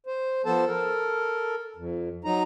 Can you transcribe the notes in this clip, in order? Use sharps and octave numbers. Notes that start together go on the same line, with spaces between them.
C5
F3 B3 A4 C5 A5
A4 A#4
F2
F#3 D#4 A#5